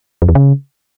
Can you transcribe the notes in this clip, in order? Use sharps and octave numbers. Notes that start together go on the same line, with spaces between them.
F2
E2
C#3